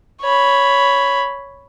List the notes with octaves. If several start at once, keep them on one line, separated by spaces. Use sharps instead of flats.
C#5 B5